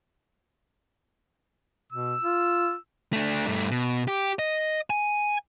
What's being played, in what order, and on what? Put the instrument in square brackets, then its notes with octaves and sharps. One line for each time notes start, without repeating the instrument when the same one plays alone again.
[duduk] B2 [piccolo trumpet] E6
[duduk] F4
[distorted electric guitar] A3 D4
G2 A3
B2
G4
D#5
G#5